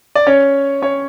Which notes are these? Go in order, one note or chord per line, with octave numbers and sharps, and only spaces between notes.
D5
C#4 C#5
C#4 C#5